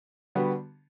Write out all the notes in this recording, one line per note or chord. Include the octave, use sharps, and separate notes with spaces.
D3 G3 B3 F#4